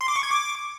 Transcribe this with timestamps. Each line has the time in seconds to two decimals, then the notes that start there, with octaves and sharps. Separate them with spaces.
0.01 C6
0.08 D6
0.16 C#6
0.23 G#6
0.31 D6